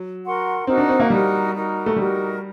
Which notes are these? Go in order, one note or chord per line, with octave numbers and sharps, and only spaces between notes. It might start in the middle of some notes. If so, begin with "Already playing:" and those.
Already playing: F#3
F#4 A#4 F#5 C6
C4 D#4 F#4 A#4
D4
C4
A#3
G3 D#4 F#4 A#4
D#4 F#4 A#4
A3
G3 D#4 F#4 A#4